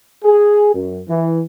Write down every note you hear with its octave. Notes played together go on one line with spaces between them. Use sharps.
G#4
F#2
E3